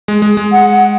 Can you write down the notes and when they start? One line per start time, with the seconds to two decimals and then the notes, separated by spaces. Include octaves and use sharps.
0.08 G#3
0.22 G#3
0.37 G#3
0.52 F#5
0.72 F#5